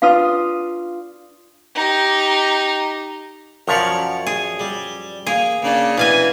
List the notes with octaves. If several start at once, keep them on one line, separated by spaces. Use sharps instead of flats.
D4 F4 B4 F5 D#6
D#4 G4
F#2 F3 A#4 C#5 D5
G#4
G3
A#3 G#4
C#3 A#3 D4
B2 E3 F5 G#5